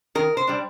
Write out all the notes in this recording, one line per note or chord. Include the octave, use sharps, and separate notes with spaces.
D#3 A#4
C5
G3 D4